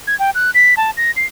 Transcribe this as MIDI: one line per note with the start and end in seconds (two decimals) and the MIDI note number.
0.07 0.18 92
0.19 0.30 79
0.35 0.51 90
0.54 0.74 95
0.77 0.91 81
0.97 1.11 94
1.16 1.26 96